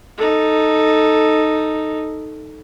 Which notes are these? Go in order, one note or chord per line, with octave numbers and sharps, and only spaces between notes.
D#4 A4